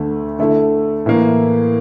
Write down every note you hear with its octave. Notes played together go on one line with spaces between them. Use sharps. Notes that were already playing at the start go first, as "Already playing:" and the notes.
Already playing: D2 D3 A3
D3 A3 E4 A4
A2 E3 A#3